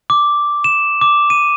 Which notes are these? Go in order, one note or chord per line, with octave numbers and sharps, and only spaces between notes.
D6
E7
D6
D#7